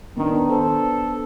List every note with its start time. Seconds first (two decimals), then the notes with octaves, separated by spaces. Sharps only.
0.17 D#3 B3 D4
0.50 A4 C5